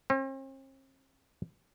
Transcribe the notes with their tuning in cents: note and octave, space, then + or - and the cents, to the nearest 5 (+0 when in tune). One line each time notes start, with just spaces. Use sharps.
C4 +45